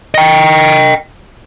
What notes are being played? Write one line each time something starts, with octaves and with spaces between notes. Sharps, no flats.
D#5 G5